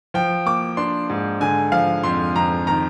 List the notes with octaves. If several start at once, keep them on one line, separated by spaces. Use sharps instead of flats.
F3 G5
A#3 D6
D4 C6
G#2
D3 G#5
F3 F5
F2 C6
F2 A#5
D#3 A#5